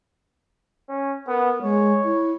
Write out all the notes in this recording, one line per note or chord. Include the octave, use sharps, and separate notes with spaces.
C#4
B3 A#4
G#3 C#5
E4